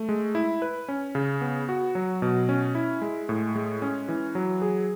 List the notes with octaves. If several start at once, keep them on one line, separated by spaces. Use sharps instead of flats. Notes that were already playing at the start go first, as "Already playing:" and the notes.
Already playing: A3
G#3
E4
B4
C#4
C#3
B3
F#4
F#3
B2
C#4
E4
G#3
A2
G#3
C#4
E3
F#3
G#4